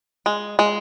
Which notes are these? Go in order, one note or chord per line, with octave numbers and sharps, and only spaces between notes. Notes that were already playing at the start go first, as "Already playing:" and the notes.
G#3
G#3